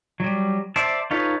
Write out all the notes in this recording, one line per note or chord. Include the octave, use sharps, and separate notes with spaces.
F#3 G3
C5 D5 E5 A5
D#4 F4 A4 B4 C#5